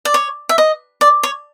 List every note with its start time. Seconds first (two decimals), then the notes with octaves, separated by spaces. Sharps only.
0.05 D5
0.14 C#5
0.49 E5
0.58 D#5
1.01 D5
1.23 C#5